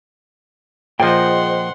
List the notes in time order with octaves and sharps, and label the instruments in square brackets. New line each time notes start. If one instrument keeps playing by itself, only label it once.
[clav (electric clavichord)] A#2 F3 [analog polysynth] G#4 C5 D#5 [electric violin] F#5 C6 [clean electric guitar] G5